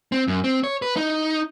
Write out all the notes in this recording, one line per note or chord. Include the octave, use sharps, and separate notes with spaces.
C4
F#2
C4
C#5
B4
D#4